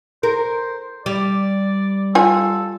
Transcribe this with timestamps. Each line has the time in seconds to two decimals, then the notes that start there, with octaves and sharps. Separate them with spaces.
0.23 A#4 C5
1.06 G3 D5
2.15 F4 A4 G#5